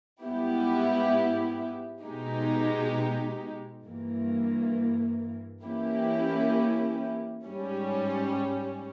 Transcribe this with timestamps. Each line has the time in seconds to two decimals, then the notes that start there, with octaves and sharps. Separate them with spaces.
0.23 G#2 G3 B3 E4 G4
2.04 B2 G#3 D#4 G4
3.84 G2 E3 A#3
5.65 E3 A#3 C#4 E4 G4
7.45 G#2 G3 C#4